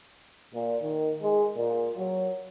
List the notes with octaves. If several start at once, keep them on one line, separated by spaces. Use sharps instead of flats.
A#2
D#3
G#3
A#2
F#3